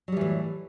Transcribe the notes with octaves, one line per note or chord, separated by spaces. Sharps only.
A2 E3 F#3 G3